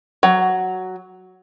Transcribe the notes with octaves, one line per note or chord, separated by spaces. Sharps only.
F#3